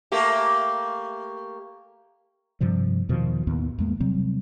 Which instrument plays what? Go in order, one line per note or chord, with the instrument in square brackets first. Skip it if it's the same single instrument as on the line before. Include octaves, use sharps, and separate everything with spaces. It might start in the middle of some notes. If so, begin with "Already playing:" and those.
[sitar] A3 A#3 G4
[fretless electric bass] G2 C3 F3 G3
E2 B2 D#3 F3
D#2 A2 D#3 B3
E2 G#3 A#3
C3 F#3 G3 C4